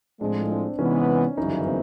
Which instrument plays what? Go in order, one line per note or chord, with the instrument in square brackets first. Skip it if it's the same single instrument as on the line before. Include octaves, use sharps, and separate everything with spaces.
[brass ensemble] A2 F3 G#3 [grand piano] C4 D4
[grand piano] C4 D4
[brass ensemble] C3 E3 G#3 B3 [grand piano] C#4 D#4
[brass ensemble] G1 F#2 C#3 E3 [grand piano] C#4 D#4
[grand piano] A#3 C4